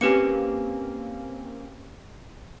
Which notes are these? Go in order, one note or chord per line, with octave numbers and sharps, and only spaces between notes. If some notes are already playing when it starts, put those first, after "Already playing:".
A#3 C4 C#4 G4 B4 C#7